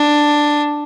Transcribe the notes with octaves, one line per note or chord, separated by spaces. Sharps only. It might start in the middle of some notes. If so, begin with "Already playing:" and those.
Already playing: D4